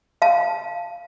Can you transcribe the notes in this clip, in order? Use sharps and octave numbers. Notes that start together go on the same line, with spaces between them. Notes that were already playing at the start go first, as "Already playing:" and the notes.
F5 A5